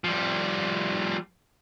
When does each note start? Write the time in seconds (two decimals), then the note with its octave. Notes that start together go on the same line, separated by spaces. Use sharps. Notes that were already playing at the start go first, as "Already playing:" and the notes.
0.04 F3 G3